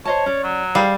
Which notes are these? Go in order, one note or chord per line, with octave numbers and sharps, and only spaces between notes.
C5 C#5 D#5 A5
C#4 D5
F#3
G3 G#4 C5 F5